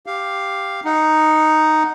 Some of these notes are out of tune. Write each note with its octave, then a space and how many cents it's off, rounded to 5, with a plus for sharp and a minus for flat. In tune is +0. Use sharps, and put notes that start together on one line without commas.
G4 +0 F5 +0
D#4 +0 F#5 +0